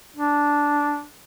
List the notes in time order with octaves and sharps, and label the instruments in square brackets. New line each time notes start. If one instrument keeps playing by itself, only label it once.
[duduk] D4